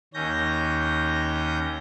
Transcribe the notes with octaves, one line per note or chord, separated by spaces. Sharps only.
D#2 C#4 G6 A#6